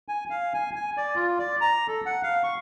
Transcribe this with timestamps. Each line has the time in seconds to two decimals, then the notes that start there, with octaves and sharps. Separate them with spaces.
0.08 G#5
0.30 F5
0.54 G#5
0.75 G#5
0.97 D5
1.16 F4
1.39 D5
1.61 A#5
1.88 A4
2.06 F#5
2.23 F5
2.44 C#6